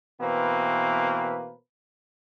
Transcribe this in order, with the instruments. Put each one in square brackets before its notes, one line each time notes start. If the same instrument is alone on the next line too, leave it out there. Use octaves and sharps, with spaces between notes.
[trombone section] B2 E3 A#3 C4 B4